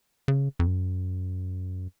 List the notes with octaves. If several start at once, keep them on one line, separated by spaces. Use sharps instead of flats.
C#3
F2
F#2